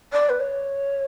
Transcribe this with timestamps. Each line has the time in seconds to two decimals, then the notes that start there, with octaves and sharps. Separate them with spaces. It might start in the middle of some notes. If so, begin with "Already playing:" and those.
0.13 D5
0.29 B4
0.40 C#5